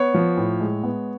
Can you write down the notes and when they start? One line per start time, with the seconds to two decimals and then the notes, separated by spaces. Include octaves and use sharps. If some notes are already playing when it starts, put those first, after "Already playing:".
Already playing: B3 C#5
0.14 F3
0.37 A2
0.60 G#3
0.83 B3